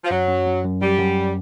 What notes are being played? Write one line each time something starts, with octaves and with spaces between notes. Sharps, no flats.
F3
F#2 F#3
F#2
F#2
F#2
F#2 G3
F#2